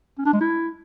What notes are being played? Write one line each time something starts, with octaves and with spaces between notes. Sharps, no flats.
C#4
D4
G#3
E4